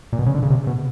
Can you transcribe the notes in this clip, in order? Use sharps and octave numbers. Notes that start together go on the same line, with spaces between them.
A#2
B2
C#3
D3
C#3
C3
B2